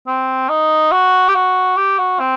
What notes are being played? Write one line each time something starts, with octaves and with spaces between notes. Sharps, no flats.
C4
D#4
F#4
G4
F#4
G4
F#4
C4